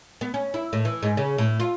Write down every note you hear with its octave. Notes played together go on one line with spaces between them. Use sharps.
B3
C#4
E4
A2
E3
G#2
C#3
A2
F4